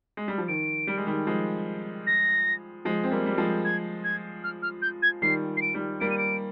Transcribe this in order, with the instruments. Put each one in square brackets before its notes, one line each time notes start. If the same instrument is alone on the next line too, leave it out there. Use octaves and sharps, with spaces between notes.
[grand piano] G#3
G3
F3
[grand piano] D#3 [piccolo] D7
[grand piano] G3
G#3
D#3 G3
F3 G#3
[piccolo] A#6
[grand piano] F3 G#3
C4
G3 A#3
G3
F3 G#3
[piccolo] G#6
G#6
F6
F6
G6
G#6
[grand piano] D#3 G3 [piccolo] C7
[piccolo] C7
D7
[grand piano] D#3 G3
[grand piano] G3 A#3 [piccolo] D7
[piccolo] D#7
D7